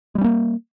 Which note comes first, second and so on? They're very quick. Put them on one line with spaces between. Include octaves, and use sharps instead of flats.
G#3 G3 C#4 A#3